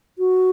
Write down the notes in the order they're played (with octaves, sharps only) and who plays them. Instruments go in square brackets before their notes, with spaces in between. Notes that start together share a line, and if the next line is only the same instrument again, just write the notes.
[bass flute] F#4